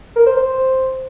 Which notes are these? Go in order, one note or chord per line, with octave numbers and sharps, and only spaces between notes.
A#4
C5
C5